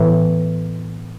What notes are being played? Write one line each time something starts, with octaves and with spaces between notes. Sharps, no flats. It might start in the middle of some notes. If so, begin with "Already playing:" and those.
Already playing: A2 E3 B3